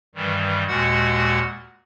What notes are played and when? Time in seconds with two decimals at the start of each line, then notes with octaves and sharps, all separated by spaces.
0.15 G2 D#3 E3 G3
0.68 D#2 A#2 G#3 F#4 F#5